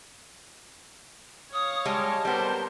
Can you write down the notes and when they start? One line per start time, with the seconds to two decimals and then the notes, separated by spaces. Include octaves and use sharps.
1.53 C#5 F5 D#6
1.85 G3 G#3 A5
2.25 G3 B3 A#4 C5